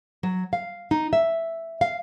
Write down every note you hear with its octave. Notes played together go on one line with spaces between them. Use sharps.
F#3
F5
D#4
E5
F5